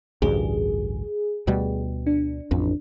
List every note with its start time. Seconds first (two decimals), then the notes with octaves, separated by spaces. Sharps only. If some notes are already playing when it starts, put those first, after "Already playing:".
0.22 A1 D2 G2 G#4
1.47 D2 B2 G3
2.07 D4
2.51 A1 F2